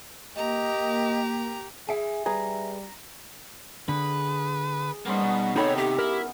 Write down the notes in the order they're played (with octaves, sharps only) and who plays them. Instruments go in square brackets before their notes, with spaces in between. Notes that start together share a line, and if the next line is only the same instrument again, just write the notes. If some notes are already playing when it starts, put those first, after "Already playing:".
[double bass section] A#3 [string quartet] G4 [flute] D#5 [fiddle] A#5
[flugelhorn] G#4 [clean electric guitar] E5 G#5
[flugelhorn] G3 [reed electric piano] G#4 B4 [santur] A#5
[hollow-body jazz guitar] D3 [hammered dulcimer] G#4 [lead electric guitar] B4
[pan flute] G3 [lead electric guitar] A#3 C5 [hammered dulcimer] B3 C#4 D#4
[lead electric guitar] B2
[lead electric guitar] C3 [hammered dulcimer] D#3 [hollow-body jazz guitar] D#4 A4 B5 [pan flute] C#5
[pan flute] G4 [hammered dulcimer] E5
[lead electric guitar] E4 [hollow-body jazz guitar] A#4